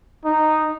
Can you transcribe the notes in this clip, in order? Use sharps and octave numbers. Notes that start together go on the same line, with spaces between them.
D#4